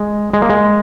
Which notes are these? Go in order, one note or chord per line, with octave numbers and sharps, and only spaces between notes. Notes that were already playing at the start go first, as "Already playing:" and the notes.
Already playing: G#3
G#3
A#3
G#3